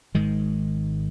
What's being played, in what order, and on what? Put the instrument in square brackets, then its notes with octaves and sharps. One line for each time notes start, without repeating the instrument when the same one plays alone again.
[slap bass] G#1 G#2 D#3 G#3